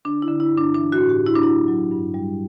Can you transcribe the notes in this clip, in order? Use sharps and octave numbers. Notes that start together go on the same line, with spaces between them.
D3 D4
E4
D3
E4
G2
D4
E3 D4
F#4
A2
G4
A2
E4
D4
F#3 E4
F#3
G2
G3